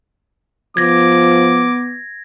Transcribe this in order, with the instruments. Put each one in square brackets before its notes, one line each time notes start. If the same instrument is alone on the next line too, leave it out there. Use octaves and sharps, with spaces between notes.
[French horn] F3 [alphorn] B3 [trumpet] D6 [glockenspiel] G#6 A#6